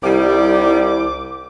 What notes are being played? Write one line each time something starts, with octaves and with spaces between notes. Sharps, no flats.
C2 D#3 G3 E4 D6